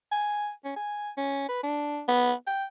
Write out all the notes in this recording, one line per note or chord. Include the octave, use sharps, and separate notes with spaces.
G#5
C#4
G#5
C#4
B4
D4
B3
G5